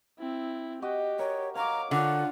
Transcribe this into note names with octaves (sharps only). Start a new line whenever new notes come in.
C4 E4
F#4 G4 D#5
A#4 C#5
C#5 F5 A#5 D6
D3 F4 F#5